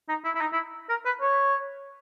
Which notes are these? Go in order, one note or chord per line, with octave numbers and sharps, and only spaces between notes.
D#4
E4
E4
D#4
E4
A#4
B4
C#5